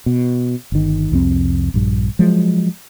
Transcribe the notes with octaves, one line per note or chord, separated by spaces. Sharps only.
B2
G1 D#3
C2 F2 C4
A#1 G2
F3 F#3 G#3